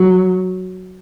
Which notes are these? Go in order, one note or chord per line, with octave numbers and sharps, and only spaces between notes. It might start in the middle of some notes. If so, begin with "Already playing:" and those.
Already playing: F#3